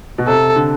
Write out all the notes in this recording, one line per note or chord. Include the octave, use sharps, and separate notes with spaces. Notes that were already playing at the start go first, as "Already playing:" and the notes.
B2
C3 A4
D3